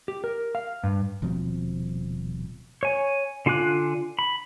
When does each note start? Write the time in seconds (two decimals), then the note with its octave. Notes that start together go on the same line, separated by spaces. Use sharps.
0.08 G4
0.24 A#4
0.55 F5
0.83 G2
1.22 D#1 B2 F3 C4
2.83 C#5 G#5
3.46 D3 F4 G#5 D6 F#6
4.19 B5